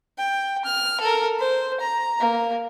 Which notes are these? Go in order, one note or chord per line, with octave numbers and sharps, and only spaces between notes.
G5
F6
A4 A#4
C5
A#5
A#3